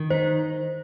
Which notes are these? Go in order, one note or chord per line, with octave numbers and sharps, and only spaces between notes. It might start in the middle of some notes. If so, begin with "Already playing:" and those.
Already playing: D#3
D#4 C5